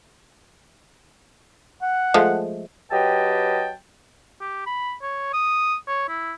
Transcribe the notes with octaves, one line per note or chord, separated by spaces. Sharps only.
F#5
F3 G#3 A3
F#3 G4 B4 D#5 G5 A5
G4
B5
C#5
D#6
C#5
E4